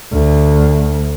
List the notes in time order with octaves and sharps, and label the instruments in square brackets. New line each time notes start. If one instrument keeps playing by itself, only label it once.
[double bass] D2